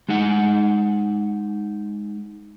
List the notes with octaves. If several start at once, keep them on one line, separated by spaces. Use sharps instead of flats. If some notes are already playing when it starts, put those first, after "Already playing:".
G#3 D#4 F#5